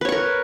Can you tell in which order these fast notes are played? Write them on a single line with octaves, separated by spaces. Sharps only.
B4 C#5 C#6 A#4